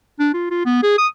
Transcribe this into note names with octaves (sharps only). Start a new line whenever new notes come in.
D4
F4
F4
B3
G#4
D#6